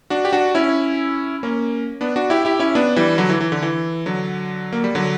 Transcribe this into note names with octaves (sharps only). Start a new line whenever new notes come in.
D4 F#4
G4
D4 F#4
C#4 E4
A#3 C#4
B3 D4
D4 F#4
E4 G4
E4 G4
C#4 E4
B3 D4
E3 G3
D3 F#3
E3
E3
D3
E3
D3 F#3
A#3
G3
D3 F#3